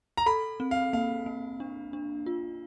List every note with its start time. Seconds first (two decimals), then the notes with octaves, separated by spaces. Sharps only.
0.17 A#5
0.26 A4 B5
0.60 C4
0.71 F5
0.93 A#3 F5
1.26 A#3
1.60 D4
1.93 D4
2.26 F4